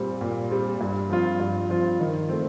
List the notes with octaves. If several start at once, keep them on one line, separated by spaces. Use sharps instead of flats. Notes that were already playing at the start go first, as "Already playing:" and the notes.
Already playing: A#2 G3 C4
A#2
G3 C4
G2
F3 C4 F4
G2
F3 C4 F4
D#3
A3 C4